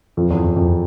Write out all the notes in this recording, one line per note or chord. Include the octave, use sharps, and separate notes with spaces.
F2
E2
E2
F2